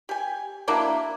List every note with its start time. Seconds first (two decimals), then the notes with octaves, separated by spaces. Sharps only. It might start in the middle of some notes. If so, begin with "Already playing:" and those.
0.09 G4 G#5
0.68 F#3 A#3 D4 E4